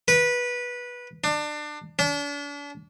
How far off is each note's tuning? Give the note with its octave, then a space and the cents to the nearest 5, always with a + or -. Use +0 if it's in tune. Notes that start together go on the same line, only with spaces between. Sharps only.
B4 -15
D4 +25
D4 -40